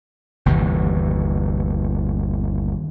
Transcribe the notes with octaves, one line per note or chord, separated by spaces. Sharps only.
G1 D#2 C3 E3